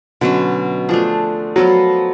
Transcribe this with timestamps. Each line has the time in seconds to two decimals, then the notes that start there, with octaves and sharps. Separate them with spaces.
0.21 B2 D3 F#3 C#4
0.89 F3 A3 D4 G#4
1.56 F3 F#3 B3 F4 A4